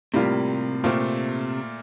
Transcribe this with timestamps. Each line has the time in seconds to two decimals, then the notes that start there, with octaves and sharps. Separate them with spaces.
0.14 A2 C3 G3 A#3 F4
0.84 A#2 A3 C4 F4